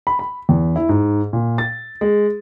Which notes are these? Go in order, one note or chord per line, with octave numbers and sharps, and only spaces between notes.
B5
B5
E2
E4
G#2
A#2
A6
G#3